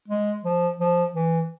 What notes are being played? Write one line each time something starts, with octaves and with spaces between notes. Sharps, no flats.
G#3
F3
F3
E3